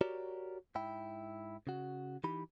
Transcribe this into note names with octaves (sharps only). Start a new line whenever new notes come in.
F#4 G4 A#4 C#5 D5
G#2 E4 G5
C#3 F#4
E3 D#4 G4 B5